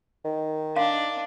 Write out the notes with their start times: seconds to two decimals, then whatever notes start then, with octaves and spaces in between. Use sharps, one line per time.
0.25 D#3
0.76 D4 F5